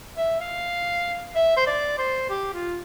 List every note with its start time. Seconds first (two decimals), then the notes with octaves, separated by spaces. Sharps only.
0.17 E5
0.40 F5
1.35 E5
1.57 C5
1.67 D5
1.98 C5
2.30 G4
2.54 F4